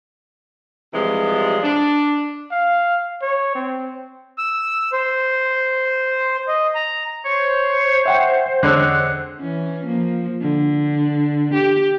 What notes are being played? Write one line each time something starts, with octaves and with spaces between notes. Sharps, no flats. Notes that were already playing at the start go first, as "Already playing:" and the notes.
C3 E3 F3 G3 G#3
D4
F5
C#5
C4
E6
C5
D#5
A#5
C5 C#5
E5 F#5 G5
E2 D3 G#3 C4 C#5 F#5 E6
E3 C#4
F3 A#3
D3
G4